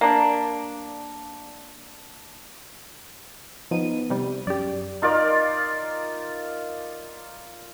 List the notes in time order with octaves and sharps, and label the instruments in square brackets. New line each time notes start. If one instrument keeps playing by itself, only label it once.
[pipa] A#3 D4
[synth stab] F3 D#7 [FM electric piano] B3 D#4
[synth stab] C3 G3
[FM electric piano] F#2 [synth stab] G4 D5
[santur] D#4 F4 A#4 D5